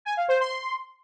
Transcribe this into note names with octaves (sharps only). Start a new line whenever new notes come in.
G#5
F5
C5
C6